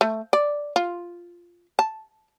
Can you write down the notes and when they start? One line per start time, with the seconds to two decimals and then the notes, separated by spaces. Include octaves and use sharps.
0.01 A3
0.33 D5
0.76 F4
1.79 A5